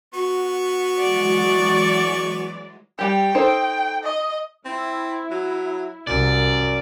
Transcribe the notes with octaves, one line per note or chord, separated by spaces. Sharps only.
B3 F#4 C#6
E3 F#3 G#3 D5
G3 G4 G5
D#4 A4 C5
D#5
C4 E4
F#3
C2 F#2 D5